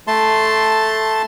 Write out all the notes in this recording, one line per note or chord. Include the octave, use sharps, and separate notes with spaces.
A3 A5 C6